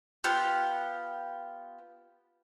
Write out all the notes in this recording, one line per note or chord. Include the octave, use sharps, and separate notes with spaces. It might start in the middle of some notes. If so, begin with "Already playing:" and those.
B3 F4 G4 F#5